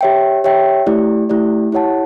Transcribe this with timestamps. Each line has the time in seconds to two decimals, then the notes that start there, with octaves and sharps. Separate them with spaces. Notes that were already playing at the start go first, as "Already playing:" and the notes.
0.01 G4 C#5 E5 G5
0.44 G4 C#5 E5 G5
0.87 A3 E4 G4 D5
1.29 A3 E4 G4 D5
1.72 E4 G4 C#5 F#5 A5